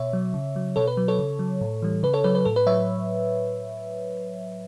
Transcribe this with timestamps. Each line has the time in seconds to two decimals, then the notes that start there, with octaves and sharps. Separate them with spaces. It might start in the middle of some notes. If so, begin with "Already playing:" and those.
Already playing: B2 C#5 E5
0.13 F#3
0.34 C#3
0.56 F#3
0.76 B2 A4 C#5
0.87 B4
0.97 F#3
1.08 A4 C#5
1.19 C#3
1.39 F#3
1.61 A2
1.82 E3 G3
2.03 C#3 B4
2.14 A4 C#5
2.24 F#3 B4
2.35 B4
2.45 A2 A4
2.56 B4
2.66 F#3 C#5 E5